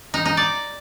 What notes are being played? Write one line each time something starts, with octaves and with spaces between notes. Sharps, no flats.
D#4
D#4
D5